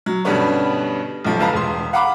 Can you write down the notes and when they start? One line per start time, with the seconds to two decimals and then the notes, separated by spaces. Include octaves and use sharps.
0.06 F#3
0.25 G2 B2 D3 G3 B3 C#4
1.24 B1 F3
1.39 F1 F3 B4 F5 A5 A#5
1.53 E1 C6
1.93 F5 F#5 A#5 B5 D6